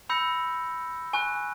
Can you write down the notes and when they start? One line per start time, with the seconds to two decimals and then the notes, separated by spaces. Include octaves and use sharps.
0.10 B5 E6 G6 A#6 C#7
1.13 G#5 C#6 F#6